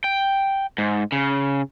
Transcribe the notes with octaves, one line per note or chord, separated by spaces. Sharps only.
G5
G#2
C#3